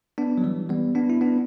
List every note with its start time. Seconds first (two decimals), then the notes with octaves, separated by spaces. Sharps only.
0.18 B3 D4
0.38 F#3
0.44 E3 G3
0.69 G3 B3
0.95 B3 D4
1.10 E4
1.21 B3 D4